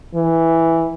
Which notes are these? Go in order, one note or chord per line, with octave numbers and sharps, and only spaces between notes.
E3